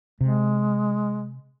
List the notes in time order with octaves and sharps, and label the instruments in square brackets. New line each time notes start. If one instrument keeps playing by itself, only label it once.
[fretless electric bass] C3 [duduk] G#3